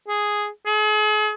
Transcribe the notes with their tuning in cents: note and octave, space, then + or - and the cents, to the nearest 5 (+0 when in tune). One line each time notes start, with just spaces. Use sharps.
G#4 +0
G#4 +40